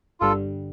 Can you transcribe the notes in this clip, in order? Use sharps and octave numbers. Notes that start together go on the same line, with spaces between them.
G1 G2 D3 G3 F4 A4